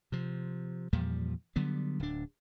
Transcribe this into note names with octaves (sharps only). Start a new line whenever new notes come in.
C3 F3
E2 A#2 F3 G3
D3 F#3 G3 B3
D1 D4